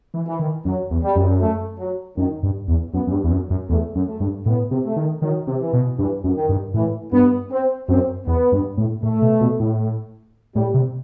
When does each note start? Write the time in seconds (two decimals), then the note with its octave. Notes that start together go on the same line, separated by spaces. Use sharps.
0.14 E3
0.27 E3
0.39 D#3
0.65 F#2 F#3
0.90 E2
1.03 G3
1.16 F#2
1.41 A3
1.79 F#3
2.17 F#2 D#3
2.43 G2
2.68 E2
2.93 F#2 B3
3.07 F#2
3.12 G2
3.24 E2
3.31 F#2
3.50 F#2
3.69 E2 A3
3.95 F#2
4.07 A3
4.20 G2
4.46 A2 B3
4.71 C3
4.84 A3
4.96 D#3
5.22 D#3 F#3
5.47 C3
5.60 E3
5.73 B2
5.99 G2 E3
6.24 F#2
6.36 D#3
6.49 G2
6.74 A2 E3
7.12 G2 B3
7.51 C4
7.88 F#2 C4
8.26 E2 B3
8.52 G2
8.77 A2
9.03 A2 A3
9.22 B2
9.41 B2
9.60 A2
10.55 A2 G3
10.74 C3